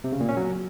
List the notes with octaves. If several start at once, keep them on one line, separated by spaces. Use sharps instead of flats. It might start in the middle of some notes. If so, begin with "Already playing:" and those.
C3
C#3
A#2
C#4
F#3